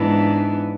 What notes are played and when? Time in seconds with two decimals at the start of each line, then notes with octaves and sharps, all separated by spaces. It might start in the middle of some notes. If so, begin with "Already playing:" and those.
Already playing: G#2 E3 B3 D4